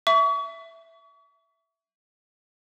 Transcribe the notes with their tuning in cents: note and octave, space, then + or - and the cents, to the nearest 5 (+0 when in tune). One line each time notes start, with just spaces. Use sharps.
E5 +5 C#6 +40